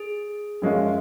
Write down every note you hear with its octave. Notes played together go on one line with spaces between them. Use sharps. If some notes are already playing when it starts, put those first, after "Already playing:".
Already playing: G#4
F#2 F3 G#3 C#4 F4